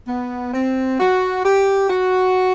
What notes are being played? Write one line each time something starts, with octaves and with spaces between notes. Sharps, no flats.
B3
C4
F#4
G4
F#4